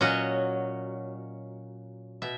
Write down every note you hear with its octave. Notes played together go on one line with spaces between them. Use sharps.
A#2 F#3 C#4 D#5 F#5
B2 E5